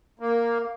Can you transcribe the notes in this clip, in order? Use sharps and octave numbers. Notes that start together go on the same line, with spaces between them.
A#3